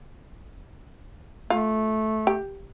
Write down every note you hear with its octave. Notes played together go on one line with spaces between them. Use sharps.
A3 F4
G4